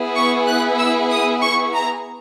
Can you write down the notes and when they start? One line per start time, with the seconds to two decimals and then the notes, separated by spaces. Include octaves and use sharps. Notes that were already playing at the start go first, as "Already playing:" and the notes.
Already playing: B3 E4 G#4
0.16 C#6
0.47 F#6
0.78 E6
1.11 D#6
1.42 C#6
1.74 A#5